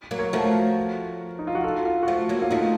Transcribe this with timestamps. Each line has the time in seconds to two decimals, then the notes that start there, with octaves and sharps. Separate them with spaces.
0.11 F#3 A#3
0.18 A#4 C#5
0.33 F3 A3 F#4 A#4
1.39 D#4
1.47 F4
1.55 F#4
1.64 F4 A4
1.85 F4
2.03 F#4
2.07 F3 A3 F4
2.29 F#3 A#3
2.42 F4
2.50 F3 A3 D#4